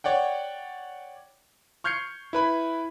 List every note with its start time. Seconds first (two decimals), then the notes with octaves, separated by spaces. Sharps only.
0.04 C#5 D5 F#5 G5
1.84 C#6 F6 G6 G#6 C7 C#7
2.33 E4 B4 B5